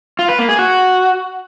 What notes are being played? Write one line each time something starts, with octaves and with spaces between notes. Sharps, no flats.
F4
B4
A#3
G#4
F#4